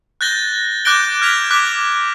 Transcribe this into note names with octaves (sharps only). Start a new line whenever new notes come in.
F#6 G6 A6 A#6 G7
D6 F#6 G6 A#6 D7 G7
F6 G#6 B6 F7 G7
D6 F#6 B6